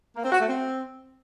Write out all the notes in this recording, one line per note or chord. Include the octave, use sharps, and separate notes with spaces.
A#3
C4
F#4
A3
C4